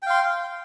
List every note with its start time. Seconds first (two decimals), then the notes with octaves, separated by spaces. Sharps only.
0.02 G5
0.06 F5
0.11 C6